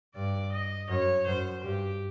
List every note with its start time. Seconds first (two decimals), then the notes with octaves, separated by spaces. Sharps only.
0.15 G2 D5
0.52 D#5
0.89 F#2 C#5
1.27 F#2 C5
1.64 G2 G4